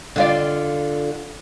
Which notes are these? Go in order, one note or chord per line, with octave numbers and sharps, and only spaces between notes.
D3 F4 D5